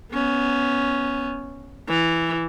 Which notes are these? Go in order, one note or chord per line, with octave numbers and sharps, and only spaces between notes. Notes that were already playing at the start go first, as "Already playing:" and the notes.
B3 C#4
E3